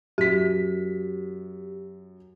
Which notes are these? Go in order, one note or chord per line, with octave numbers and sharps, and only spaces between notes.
F#2 G4 B6